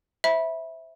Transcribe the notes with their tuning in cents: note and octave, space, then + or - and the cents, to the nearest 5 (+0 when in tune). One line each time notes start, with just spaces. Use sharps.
C5 +0 E5 -10 B5 -20